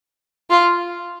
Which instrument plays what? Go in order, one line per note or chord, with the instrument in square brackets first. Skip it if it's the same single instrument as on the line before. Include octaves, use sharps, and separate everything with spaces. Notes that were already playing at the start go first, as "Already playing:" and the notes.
[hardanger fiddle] F4